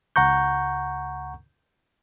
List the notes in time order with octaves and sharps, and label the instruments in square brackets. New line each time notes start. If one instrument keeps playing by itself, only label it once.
[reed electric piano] C#2 F#5 A#5 C#6 G6